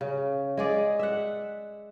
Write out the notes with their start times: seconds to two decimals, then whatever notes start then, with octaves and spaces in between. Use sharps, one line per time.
0.01 C#3
0.57 G#3 G#4 D5
0.99 E5 F#5